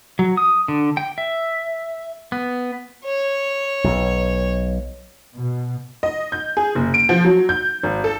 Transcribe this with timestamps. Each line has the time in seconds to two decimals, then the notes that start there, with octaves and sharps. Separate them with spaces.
0.19 F#3
0.37 D#6
0.68 D3
0.97 G5
1.18 E5
2.32 B3
3.05 C#5
3.84 B1
5.37 B2
6.03 D#5
6.32 G6
6.57 G#4
6.75 F#1
6.94 D7
7.09 F3
7.25 F#3
7.49 G6
7.83 G#1
8.04 A4